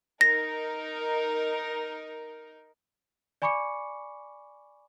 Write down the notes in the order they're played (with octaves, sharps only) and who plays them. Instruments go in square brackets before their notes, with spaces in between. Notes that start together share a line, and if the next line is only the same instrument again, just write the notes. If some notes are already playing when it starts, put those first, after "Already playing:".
[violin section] D#4 A#4 [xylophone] A#6
[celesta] D5 G#5 B5 C#6 D6 C#7